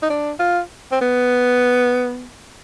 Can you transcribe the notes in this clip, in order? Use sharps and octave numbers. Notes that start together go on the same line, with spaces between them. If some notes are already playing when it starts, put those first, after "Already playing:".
D#4
D4
F4
C4
B3